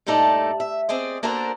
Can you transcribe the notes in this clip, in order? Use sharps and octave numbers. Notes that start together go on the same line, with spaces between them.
G2 A#2 A3 D#4 A4 D5
E5
C4 G#4 D5 D#5
A#3 D4 F#4 A4 A#4 C5